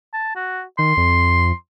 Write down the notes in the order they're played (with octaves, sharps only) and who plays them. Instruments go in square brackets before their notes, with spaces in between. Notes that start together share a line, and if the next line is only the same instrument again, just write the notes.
[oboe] A5
F#4
[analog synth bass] D#3 [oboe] C6
[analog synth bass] F2